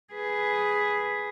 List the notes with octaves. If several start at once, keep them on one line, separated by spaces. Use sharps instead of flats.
G#4 B4